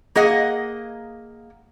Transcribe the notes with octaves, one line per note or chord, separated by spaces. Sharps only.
A#3 G#4 D#5 F#5